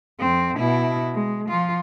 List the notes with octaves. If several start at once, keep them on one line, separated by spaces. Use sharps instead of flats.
F2 C4
B2 E4
G#3
F3 F4